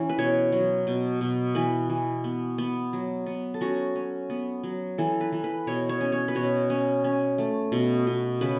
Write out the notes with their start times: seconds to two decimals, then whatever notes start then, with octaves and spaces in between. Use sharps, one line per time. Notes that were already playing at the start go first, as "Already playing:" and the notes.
Already playing: E3 C#4
0.10 B4
0.18 B2 C#5
0.52 F#3
0.87 B2
1.21 B2
1.55 E3 B4
1.90 E3
2.24 B3
2.58 B3
2.93 F#3
3.26 B3
3.54 A4
3.61 C#4 F#4
3.96 C#4
4.30 B3
4.64 F#3
4.98 E3 A4
5.21 B4
5.32 E3
5.44 B4
5.67 B2 C#5
5.89 C#5
6.01 C#4
6.12 C#5
6.28 B4
6.35 B2 C#5
6.70 C#4
7.04 C#4
7.38 A3
7.72 B2
8.07 B2
8.41 C#3 B4